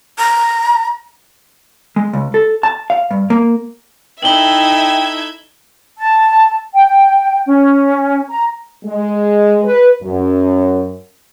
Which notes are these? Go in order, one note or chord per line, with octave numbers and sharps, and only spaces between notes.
A#5
G#3
C#2
A4
A5
F5
G2
A#3
D#4 E4 A4 E5 G5 G#6 F#7 G7
A5
G5
C#4
A#5
G#3
B4
F#2